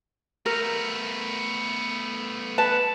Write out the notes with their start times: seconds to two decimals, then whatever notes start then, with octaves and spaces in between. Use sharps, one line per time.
0.46 A3 B3 A#4
2.58 B4 A5